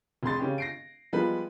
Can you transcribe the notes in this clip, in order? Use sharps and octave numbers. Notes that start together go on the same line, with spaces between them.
F1 G#4 C6 A6
C#3 C#4 G4
A#6 C7 D7
F3 G3 G#3 B3 B4